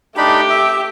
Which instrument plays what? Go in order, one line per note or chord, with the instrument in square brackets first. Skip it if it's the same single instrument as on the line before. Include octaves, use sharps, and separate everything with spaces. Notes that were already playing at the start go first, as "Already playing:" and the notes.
[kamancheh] A3 G4 [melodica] D4 D#4 B5
[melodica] E5